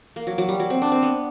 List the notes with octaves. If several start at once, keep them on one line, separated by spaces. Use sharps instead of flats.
A#3
F#3
F#3
G3
F#3
C4
D4
C4
B3